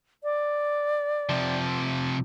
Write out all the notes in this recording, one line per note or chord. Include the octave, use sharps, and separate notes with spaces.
D5
C3 F3